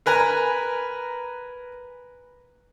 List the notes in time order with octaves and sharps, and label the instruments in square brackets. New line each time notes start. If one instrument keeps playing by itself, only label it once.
[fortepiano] A#4 B4 G#5 A#5